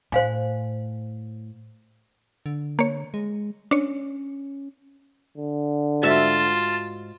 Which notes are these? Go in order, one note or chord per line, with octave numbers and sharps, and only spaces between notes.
A2 C5 F5 G#5
D3
A#3 C#5
G#3
C#4 D4 C#5
D3
G#2 F4 F#4 E5 A5